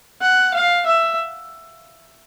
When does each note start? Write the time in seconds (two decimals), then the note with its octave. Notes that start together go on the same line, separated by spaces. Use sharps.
0.22 F#5
0.54 F5
0.86 E5